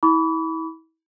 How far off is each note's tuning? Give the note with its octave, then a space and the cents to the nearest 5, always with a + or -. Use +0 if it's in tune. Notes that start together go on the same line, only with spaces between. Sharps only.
E4 -35 B5 +0 D6 -45